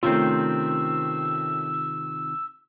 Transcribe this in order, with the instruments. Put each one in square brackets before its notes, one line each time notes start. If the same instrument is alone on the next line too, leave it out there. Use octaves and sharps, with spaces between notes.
[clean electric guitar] C3 D#3 C4 [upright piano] A3 C#4 [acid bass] F4 [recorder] E6